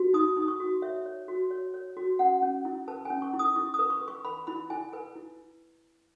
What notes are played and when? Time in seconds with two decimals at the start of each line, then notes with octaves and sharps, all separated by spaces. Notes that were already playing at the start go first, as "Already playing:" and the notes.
Already playing: F#4
0.13 D#4 D#6
0.37 D#4
0.42 D#6
0.48 C#6
0.60 F#4
0.82 C#5 E5
1.05 C#5
1.28 F#4
1.51 C#5
1.74 C#5
1.97 F#4
2.19 C#4 F#5
2.42 C#4
2.65 E4
2.88 B4 A5
3.05 C#4 G#5
3.22 C#6
3.34 E4
3.39 D#6
3.56 E4 C#6
3.74 D#6
3.79 B4
3.90 C#6
4.01 B4
4.08 C#6
4.25 B4 B5
4.47 E4 B5
4.70 E4 G#5
4.93 B4 G#5
5.16 E4